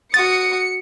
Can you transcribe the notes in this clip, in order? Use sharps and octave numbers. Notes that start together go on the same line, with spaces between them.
F#4 D#6 A6 C#7